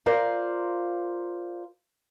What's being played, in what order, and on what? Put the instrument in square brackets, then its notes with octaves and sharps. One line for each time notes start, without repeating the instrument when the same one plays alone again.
[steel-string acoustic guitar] F4 A#4 C5 D5 F5